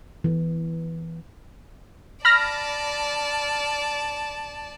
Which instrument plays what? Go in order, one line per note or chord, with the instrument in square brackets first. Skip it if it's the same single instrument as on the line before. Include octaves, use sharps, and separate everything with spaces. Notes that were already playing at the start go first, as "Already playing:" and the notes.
[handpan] E3
[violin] D5 A5 [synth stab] B5 F6 A#6